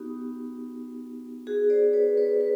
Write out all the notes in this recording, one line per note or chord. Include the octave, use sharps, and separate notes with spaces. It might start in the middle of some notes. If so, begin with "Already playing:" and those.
Already playing: B3 D#4 F#4 G4
F#4 G#4
C5 D5
B4 C#5
B4 C#5
B4